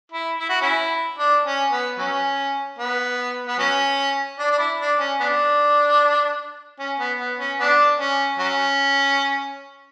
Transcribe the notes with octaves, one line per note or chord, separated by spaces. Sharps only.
E4
E4
F#4
C#4 E4
D4
C#4
B3
F#3 C#4
B3
B3
F#3 C#4
D4
D4
E4
D4
C#4
B3 D4
C#4
B3
B3
C#4
B3 D4
C#4
F#3 C#4